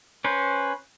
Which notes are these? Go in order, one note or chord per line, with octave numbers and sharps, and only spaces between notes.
C#4 B4 C5